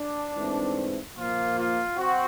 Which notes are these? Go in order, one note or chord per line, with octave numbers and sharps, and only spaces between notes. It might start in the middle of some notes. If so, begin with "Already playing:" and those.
Already playing: D4
G#2 E3 A3 C4
A#2 F3 A#3 F4
F4
C4 F#4